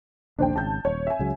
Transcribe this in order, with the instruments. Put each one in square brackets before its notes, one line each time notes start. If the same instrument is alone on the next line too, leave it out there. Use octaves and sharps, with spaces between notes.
[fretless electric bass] A#1 D#2 D3 [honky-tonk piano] D4 C5 G5
[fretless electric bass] G#1 C#3 [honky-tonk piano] A5 G6
[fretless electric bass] D#1 [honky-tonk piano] C#5
[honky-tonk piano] E5 G#5
[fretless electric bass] C#2 C#3 F#3